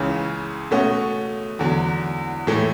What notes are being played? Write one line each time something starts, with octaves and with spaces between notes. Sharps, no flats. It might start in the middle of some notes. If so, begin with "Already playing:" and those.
Already playing: C#2 C#3 E3
B2 A3 C#4 F#4
E2 D3 F#3
A2 E3 A3